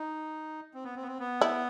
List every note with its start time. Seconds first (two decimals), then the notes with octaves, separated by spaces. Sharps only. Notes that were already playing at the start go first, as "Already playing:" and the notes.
Already playing: D#4
0.74 C4
0.85 B3
0.96 C4
1.02 B3
1.08 C4
1.19 B3
1.41 E4